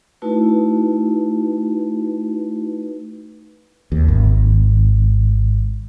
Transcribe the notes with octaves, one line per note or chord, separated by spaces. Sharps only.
A3 D#4 E4 F#4 B4
D#2
G#1